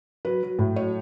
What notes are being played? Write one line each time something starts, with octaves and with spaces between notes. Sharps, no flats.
F#3 B4
F#3
A2
F#3 C#5